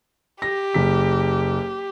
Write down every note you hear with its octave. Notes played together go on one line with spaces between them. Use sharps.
G4 A#6
F#1 B6